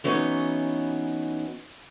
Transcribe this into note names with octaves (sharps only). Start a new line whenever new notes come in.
E3 F#3 G3 B3 C#4 D#4